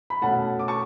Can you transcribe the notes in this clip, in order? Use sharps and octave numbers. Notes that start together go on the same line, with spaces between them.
B5
B2 A3 C#4 F#5 A5
D6
A5 C#6